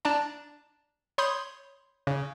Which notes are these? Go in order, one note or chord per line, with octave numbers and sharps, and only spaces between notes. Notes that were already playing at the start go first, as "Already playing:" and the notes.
D4 D5 A5 A#5
C#5 B5 C6 D#6 G6
C#3